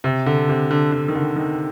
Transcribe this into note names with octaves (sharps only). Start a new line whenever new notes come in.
C3
D3
C3
D3
D3
D#3
D3
D#3